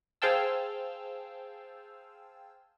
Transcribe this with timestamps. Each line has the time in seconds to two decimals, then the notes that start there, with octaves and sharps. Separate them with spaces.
0.22 G#4 C5 F5 G5 A5 E6